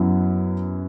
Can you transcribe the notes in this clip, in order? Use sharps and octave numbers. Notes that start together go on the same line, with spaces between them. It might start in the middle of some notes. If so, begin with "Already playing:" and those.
Already playing: F#2 F#3 B3 E4